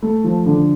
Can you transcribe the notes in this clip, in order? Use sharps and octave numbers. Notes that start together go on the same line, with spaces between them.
A3
F3
D3